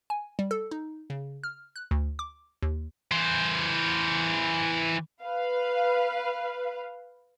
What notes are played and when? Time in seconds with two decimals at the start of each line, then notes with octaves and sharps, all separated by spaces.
0.10 G#5
0.39 G3
0.51 A4
0.71 D#4
1.10 C#3
1.44 F6
1.76 F#6
1.91 D2
2.19 D6
2.62 D#2
3.11 E3 C5
5.23 B4 F5